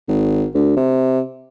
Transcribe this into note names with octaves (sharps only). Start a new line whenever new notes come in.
G#1
D2
C3